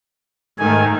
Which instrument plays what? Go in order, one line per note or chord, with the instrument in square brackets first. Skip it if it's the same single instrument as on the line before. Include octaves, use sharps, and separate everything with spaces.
[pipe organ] G#2 G#5 [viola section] D#3 A3